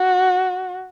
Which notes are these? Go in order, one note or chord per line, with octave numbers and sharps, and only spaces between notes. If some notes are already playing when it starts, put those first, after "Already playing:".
Already playing: F#4